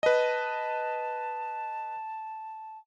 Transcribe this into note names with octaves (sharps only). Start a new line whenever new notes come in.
B4 D#5 A5